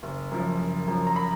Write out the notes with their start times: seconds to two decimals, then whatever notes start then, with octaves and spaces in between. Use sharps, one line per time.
0.03 F#1
0.31 F#2 F3
0.59 F#1
0.88 F#2 F3
1.07 A#5
1.16 B5